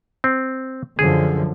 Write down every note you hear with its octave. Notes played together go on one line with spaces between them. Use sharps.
C4
F#2 D3 F3 G#4